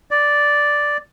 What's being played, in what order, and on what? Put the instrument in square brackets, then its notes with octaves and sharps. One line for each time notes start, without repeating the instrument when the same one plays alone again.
[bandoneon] D5